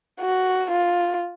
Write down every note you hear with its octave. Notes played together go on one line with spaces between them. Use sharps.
F#4
F4